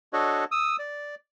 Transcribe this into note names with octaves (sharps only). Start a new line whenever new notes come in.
D4 F#4 A4 C#5 D#5
D#6 E6
D5